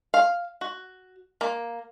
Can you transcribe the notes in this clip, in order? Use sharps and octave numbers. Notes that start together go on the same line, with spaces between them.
F5
F#4
A#3